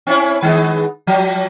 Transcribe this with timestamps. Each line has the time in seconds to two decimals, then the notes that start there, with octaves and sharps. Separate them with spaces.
0.07 C4 C#4 E4
0.42 D#3 G#3 B3
1.07 F3 F#3